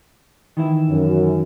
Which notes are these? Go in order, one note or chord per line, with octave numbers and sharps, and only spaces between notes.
D#3 E3 E4
F#2